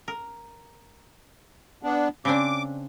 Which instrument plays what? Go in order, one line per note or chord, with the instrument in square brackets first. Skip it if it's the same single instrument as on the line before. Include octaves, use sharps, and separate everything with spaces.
[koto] A#4
[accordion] B3 D4
[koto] C#3 C4 D4 [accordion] D6